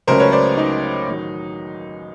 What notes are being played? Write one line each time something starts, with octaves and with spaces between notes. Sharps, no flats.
C#2 C#3 F#3 A3 C#4 A#4 C5
B4 C#5
C5 D5
D#4
A1 D#3 F#3